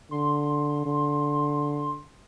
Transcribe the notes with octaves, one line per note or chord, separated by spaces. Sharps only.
D3 C6
D3